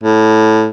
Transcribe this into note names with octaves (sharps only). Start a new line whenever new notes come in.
A2